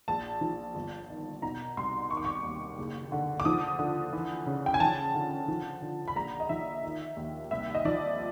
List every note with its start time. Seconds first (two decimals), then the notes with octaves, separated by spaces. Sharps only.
0.08 A#1 A5
0.41 F3
0.75 G1
1.09 D#3
1.42 B2 A#5
1.77 C2 C6
2.10 D#3 C#6
2.17 D6
2.25 C#6
2.44 D#2
2.78 F#1
3.12 D3
3.40 D6
3.45 F3 D#6
3.79 D3
4.13 E3
4.46 C#3
4.66 G5
4.74 G#5
4.80 F3 A5
5.15 D3
5.48 F3
5.82 D3
6.08 B5
6.16 A#1 A#5
6.40 D#5
6.49 F3 E5
6.83 D#3
7.17 D#2
7.51 C2 E5
7.75 D#5
7.85 F3 D5